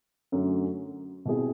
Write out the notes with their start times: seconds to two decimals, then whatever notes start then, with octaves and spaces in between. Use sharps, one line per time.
0.32 F#2 D3 F#3 A3 C#4
1.25 B2 G3 C4 E4 G#4